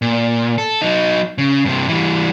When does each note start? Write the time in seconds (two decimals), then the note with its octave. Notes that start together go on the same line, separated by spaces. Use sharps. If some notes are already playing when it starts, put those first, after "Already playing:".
0.02 A#2
0.58 A4
0.82 F#3 D#4
1.38 C#3
1.65 G2 C3
1.88 E3 G3